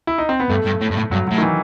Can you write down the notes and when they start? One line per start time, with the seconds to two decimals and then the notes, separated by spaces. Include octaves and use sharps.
0.07 E4
0.18 D#4
0.29 C4
0.40 B3
0.49 G2 A3
0.66 G2
0.81 A2
0.91 G2
0.96 A2
1.11 G2 F#3
1.27 A2 F#3
1.38 D#3
1.42 E3